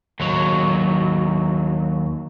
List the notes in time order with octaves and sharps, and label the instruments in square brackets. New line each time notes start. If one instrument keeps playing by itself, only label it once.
[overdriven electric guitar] D#2 F#3